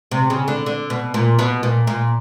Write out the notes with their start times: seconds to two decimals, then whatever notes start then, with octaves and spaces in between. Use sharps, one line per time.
0.11 C3
0.30 C#3
0.48 D3
0.66 D3
0.90 B2
1.14 A#2
1.39 B2
1.63 A#2
1.87 A#2